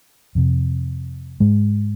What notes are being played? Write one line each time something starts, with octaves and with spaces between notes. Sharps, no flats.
F2 C3
G#2 G#3